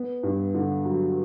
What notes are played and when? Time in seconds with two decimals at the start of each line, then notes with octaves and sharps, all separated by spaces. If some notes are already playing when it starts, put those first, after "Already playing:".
Already playing: B3
0.23 G2
0.54 D3
0.85 F#3